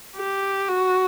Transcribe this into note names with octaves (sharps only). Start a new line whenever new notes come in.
G4
F#4